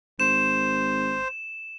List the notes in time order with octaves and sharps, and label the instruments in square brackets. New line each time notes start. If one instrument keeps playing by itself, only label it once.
[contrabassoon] G#1 [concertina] C5 [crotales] E7